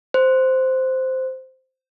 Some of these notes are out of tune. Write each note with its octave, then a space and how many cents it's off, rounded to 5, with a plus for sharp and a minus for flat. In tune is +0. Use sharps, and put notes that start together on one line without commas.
C5 -5